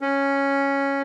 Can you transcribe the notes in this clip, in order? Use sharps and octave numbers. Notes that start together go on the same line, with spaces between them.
C#4